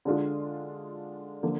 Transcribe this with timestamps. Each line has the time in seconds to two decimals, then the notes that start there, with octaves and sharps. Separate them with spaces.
0.05 D3 G#3 D4 F4
1.43 D3 F3 A#3